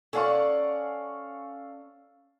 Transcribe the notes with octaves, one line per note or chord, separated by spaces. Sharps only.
C#4 A4 D5 F5 F#5 C#6